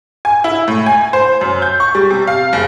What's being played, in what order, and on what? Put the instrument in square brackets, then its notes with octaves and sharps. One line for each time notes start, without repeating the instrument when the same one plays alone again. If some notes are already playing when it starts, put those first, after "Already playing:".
[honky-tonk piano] G#5
E4
A2
G#5
C5
F#2
G6
C#6
G3
C3
F5
F#1